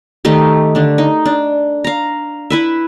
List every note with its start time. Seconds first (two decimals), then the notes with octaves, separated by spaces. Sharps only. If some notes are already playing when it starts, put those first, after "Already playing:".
0.25 D#3 A3 D#4 G4
0.75 D3 D4
0.98 D#4
1.26 D4
1.84 F5 A#5
2.50 E4 B4 E5